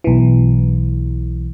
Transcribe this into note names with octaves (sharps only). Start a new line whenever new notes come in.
B1 E3